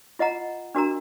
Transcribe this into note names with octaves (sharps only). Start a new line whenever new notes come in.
F4 D#5 F#5 A#5
D4 F#4 A#4 A#5